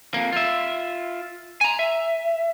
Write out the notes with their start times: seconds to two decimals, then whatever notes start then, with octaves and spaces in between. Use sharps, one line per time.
0.14 F2 A#3
0.33 F4 E5
1.61 G#5 A#5
1.79 E5